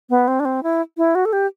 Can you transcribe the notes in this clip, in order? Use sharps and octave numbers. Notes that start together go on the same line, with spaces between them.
B3
C4
D4
C4
E4
E4
F#4
A4
G4